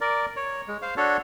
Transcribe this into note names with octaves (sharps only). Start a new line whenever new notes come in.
A#4 D5
C#5
G#3
C5 F5
D4 F#4 A4 C#5